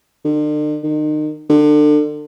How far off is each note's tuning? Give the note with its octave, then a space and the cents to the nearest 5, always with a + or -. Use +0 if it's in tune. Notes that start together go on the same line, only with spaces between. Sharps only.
D3 +45
D#3 -35
D3 +30